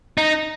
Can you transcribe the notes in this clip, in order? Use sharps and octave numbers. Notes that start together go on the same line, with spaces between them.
D#4